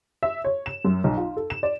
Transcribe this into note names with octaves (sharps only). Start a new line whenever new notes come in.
E5
C#5
E7
F#2
B1
F4
A4
E7
D5